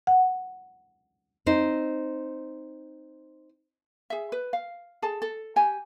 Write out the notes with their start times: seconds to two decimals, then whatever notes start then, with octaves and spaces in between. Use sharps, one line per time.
0.07 F#5
1.46 C4 D#4 C5
4.10 G#4 E5
4.32 B4
4.53 F5
5.02 G#4 A4 A5
5.22 A4
5.56 G4 G#5